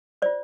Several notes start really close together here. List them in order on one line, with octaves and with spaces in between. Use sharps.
C5 D5 F4